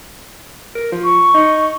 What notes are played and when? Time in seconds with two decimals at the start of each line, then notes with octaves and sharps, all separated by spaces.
0.75 A#4
0.92 F3
1.04 C#6
1.34 D#4